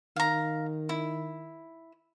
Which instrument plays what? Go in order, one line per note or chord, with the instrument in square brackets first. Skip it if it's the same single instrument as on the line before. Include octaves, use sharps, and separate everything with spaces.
[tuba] D#3 [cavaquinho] F5 A#5
[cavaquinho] E4